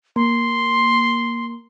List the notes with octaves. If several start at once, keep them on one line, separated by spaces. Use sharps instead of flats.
A#3 C6